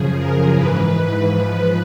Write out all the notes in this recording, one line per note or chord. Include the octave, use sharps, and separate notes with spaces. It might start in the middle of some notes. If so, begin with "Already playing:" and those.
Already playing: F#2 C#3 F3 G#4
A#4
G#2 E3 B4
G#2 F3